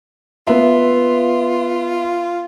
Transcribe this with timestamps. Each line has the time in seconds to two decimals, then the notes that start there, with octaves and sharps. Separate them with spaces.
0.47 B3 F4 E5